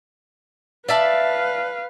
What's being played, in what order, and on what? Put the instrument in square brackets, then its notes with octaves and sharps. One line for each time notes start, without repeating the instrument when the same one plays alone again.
[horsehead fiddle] B4 F5 [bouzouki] D5 E5 A5